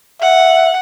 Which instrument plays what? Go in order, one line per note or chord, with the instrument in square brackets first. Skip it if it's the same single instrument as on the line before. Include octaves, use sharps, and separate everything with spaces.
[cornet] E5 [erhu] F#5